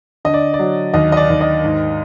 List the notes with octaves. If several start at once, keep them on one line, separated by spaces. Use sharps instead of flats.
D3 D#5
D5
D5
F#3
D#2 D#5
D#5
D5
D#2
D#5
G#2